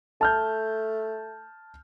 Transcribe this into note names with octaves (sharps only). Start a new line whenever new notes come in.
A3 A5 F6 G6